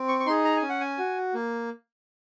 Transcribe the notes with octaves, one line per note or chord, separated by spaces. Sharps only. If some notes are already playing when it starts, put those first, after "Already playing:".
Already playing: C4
C#6
C#6
D#4 G#4 C6
A#5
G#5
C#4
F#5
G#5
F#4
A#3